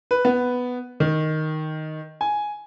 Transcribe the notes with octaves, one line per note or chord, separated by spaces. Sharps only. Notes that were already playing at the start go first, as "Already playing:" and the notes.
B4
B3
D#3
G#5